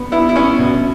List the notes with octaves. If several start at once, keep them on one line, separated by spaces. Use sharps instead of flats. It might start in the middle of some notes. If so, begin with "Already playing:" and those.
Already playing: B3
B3 E4
E4
B3 C#4
B2